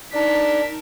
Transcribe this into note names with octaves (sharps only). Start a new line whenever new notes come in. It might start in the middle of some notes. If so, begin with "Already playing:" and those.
D4 D#4 A#4 A5 B6